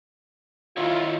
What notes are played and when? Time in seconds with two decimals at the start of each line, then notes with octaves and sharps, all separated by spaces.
0.77 D#3 E4 F4 C#5